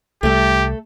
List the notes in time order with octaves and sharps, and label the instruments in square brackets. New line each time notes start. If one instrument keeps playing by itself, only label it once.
[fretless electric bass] C2 G3 [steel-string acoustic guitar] A3 A4 [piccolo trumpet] G4